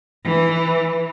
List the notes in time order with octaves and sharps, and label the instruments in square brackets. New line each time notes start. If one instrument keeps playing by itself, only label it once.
[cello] E3